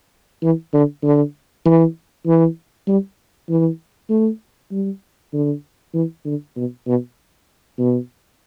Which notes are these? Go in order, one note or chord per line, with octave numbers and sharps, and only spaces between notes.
E3
D3
D3
E3
E3
G3
E3
A3
G3
D3
E3
D3
B2
B2
B2